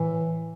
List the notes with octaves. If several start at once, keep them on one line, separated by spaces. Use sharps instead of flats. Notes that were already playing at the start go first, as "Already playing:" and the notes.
Already playing: A2 E3